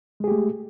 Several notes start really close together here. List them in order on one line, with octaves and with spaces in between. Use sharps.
G#3 G#4 G4 A3